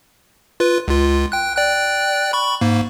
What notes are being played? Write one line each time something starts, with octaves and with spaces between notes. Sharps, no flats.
F4 B4
C#2 F4
G5 F#6
D5 G5 F#6
B5 C#6
G#2 A#3